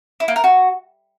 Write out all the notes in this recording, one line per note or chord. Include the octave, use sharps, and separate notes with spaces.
E4
A#3
A#4
F#4